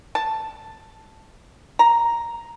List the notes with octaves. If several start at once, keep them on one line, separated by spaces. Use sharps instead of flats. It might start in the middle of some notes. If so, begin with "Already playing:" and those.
A5
A#5